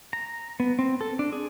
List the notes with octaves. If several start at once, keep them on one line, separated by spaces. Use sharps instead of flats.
A#5
B3
C4
A4
D4
G#4